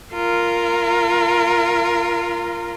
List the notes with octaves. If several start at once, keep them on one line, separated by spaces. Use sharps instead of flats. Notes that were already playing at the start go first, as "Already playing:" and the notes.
F4 A#4